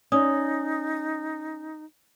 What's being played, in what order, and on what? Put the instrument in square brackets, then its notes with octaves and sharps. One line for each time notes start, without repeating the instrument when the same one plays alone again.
[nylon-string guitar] C#4 [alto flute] D#4 [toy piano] D5 D#6